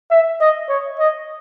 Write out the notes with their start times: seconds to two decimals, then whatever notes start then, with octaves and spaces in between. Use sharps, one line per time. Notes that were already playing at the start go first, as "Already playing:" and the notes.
0.11 E5
0.40 D#5
0.69 C#5
0.99 D#5